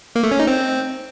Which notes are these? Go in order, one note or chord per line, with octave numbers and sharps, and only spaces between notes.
A#3
A3
C#4
D#4
C4